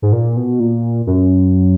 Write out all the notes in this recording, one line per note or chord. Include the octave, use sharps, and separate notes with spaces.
G#2
A#2
B2
A#2
F#2